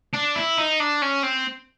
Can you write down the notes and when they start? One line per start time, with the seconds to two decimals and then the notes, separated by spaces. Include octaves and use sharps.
0.13 D4
0.35 E4
0.58 D#4
0.80 D4
1.02 C#4
1.23 C4